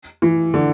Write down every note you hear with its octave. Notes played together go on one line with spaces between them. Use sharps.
E3
D3